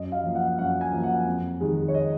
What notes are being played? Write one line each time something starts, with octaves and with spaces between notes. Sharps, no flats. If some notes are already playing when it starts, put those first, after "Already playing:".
Already playing: F#2 D#5
F5
F3 A#3
F#5
F#2 F#5
G#5
F3 A#3
F#5
F2
D#3 G#3
C#5
D#5